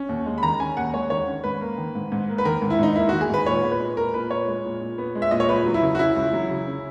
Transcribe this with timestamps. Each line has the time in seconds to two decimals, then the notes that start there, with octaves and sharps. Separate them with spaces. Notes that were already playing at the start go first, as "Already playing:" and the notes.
Already playing: C#4
0.09 D#2
0.26 G#3
0.38 B5
0.43 D#3 A#5
0.60 C#4 G#5
0.77 D#2 F#5
0.94 G#3 C#5
1.10 D#3 C#5
1.27 C#4
1.44 G#2 B4
1.61 A#3
1.78 D#3
1.95 G#2
2.12 G#2
2.29 A#3
2.38 B4
2.45 D#3 A#4
2.62 G#2
2.70 E4
2.79 G#2 D#4
2.96 A#3 E4
3.09 D#3 F#4
3.21 G#4
3.30 G#2 B4
3.46 A#2 C#5
3.63 B3
3.72 B4
3.80 G#3
3.97 A#2 A#4
4.14 A#2 B4
4.31 B3 C#5
4.47 G#3
4.64 A#2
4.81 A#2
4.98 B3
5.15 G#3
5.22 E5
5.31 A#2 D#5
5.40 C#5
5.49 C#2 B4
5.66 F#3
5.74 E4
5.82 C#3
5.95 F#4
5.99 C#4 E4
6.16 C#2
6.33 F#3
6.50 C#3
6.67 C#4